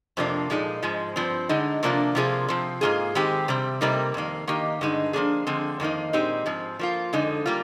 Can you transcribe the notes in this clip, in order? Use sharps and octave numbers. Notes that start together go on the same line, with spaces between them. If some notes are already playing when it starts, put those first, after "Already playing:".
F2 C3 F3 A#3 D4
A#2 F3 G#3 D#4
G#2 F3 G#3
G2 F3 C4
D3 G#3 D#4
C3 F3 A#3 D4 F4
C3 F3 A#3 F4 G#4
C3 F3 C4
G#2 D#3 A#3 F4 G#4
D#3 G#3 C4 G4
C3 G3 C4
C3 G3 A#3 D#4 A#4
F2 D#3 A#3
D#3 A#3 D#4 G4
G2 D3 G#3 D#4
F3 A#3 D4 G#4
D3 F3 G#3 C4
F2 D#3 A#3 D#4
A#2 G#3 C4 D#4 G4
G#2 F3 C4
F3 A#3 F4
F2 D3 G#3 D#4
G3 A#3 F4